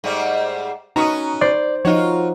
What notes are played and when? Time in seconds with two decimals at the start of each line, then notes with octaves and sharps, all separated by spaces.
0.04 G#2 G3 A3
0.96 B3 C#4 D#4 F#4 A#5 C#6 D#6
1.41 C5 D5
1.85 F3 D#4 F4 F#4 C#5